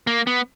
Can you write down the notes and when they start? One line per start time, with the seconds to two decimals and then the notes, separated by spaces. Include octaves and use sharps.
0.07 A#3
0.27 B3